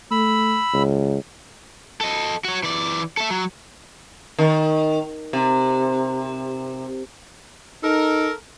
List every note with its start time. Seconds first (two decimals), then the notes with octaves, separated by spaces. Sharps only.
0.11 A3 B5 E6
0.73 C#2
2.01 A4 D#5
2.45 F#4 C#5
2.63 E3 D5
3.17 A4 E5
3.30 F#3
4.39 D#3
5.33 C3
7.84 D#4 A4 A#4